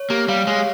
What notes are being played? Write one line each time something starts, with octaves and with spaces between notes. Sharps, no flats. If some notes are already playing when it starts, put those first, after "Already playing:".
Already playing: C#5
A#3 G4
G3 F5
G#3 C#5